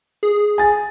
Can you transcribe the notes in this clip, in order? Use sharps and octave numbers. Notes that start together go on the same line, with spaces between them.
G#4
G#5 A6